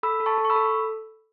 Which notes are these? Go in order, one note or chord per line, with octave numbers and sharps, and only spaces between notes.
A4 B5 E6
A4
A5 C#6
A4
C#6
B5 E6
A4